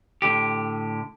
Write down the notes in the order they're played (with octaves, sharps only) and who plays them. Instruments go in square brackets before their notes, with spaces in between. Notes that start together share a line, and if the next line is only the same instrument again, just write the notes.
[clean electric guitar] A2 D3 G4